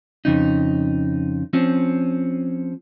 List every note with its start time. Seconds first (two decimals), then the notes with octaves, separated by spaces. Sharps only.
0.25 F2 C#3 D#4
1.53 F3 C4 C#4